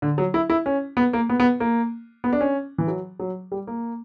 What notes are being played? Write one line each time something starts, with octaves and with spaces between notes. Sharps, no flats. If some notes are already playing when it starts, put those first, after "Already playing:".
D3
F#3
E4
E4
C#4
B3
A#3
B3
B3
A#3
B3
D4
C#4
E3
F#3
F#3
G3
A#3